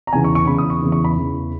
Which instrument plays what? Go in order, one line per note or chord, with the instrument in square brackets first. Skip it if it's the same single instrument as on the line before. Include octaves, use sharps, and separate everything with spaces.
[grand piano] A#5
E2 C#3 E3 G#5
C#6
C#6
E2 C#3 E3 B5
D#6
C#6
E2 C#3 E3
C#6
B5
E2 C#3 E3